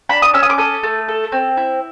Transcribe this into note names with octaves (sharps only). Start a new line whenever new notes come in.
D4 B5
D#6
C#4 E6
D#6
D6
A4 D#6
A3
A4
C4
E4